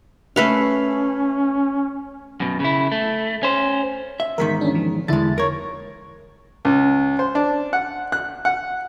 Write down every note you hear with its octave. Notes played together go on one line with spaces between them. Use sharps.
A3 C#4 B4 F5
F#2 B2
C#3 E4
A3
C#4 C5
E5
E2 G#2 D#3 A#4 B6
C#4 D4
F3
E2 D3 G#3 E4 A6
A#4 C#5
C#2
C5
D4
F#5
F#6
F#5